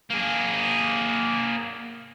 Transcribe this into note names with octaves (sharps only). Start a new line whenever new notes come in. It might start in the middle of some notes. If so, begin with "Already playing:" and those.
A#3 G#4